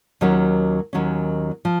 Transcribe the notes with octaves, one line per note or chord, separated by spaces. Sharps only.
D#2 D#3 F#3 C#4
D#2 D#3 F#3 C#4
F3